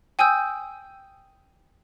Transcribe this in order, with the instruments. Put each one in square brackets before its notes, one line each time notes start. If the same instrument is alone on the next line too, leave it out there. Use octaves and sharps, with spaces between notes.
[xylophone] G5 G#5 D#6 E6 G6